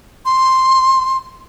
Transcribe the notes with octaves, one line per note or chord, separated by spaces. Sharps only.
C6